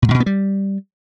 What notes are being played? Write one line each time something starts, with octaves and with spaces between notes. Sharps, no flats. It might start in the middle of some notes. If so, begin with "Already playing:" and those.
B2
G#2
B2
B3
G3